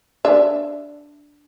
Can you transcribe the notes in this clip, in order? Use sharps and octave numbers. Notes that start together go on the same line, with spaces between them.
D4 E5